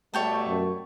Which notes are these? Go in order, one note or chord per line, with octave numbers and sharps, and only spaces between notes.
B2 G3 A3 C#5 G5 A5
F#2